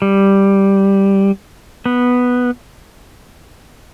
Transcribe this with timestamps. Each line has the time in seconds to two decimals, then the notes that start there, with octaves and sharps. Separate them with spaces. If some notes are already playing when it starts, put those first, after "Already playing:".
0.02 G3
1.86 B3